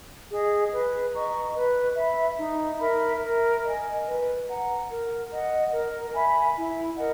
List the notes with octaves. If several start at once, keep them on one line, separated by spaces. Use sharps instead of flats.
G#4 D#5
B4
D#5 A#5 C#6
B4
E5 B5
D#4
A#4 E5 B5
A#4
D#5 G#5
B4
F#5 A#5
A#4
D#5 F#5
A#4
E5 G#5 B5
E4
A#4 D#5 F#5